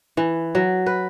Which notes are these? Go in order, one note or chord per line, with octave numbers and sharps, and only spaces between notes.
E3
F#3
B4